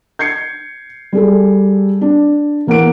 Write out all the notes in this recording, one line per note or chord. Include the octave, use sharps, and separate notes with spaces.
G6 G#6 C7 C#7
G3 G#4 A4
D4
E2 A#3 F#5 D7